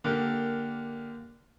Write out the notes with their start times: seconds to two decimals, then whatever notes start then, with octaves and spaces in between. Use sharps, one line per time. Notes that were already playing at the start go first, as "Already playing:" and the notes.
0.04 D3 A#3 G4 A#4